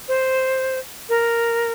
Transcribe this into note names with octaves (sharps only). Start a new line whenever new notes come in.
C5
A#4